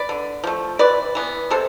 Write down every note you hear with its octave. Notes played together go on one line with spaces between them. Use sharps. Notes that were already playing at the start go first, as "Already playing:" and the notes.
Already playing: B4 D5
D3
F3 A3
C3 B4 D5
E3 B3
C3 A4 C5